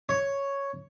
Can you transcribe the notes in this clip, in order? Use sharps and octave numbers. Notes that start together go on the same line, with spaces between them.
C#5